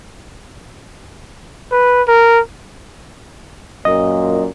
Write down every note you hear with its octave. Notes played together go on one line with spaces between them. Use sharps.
B4
A#4
F#2 A#2 D#5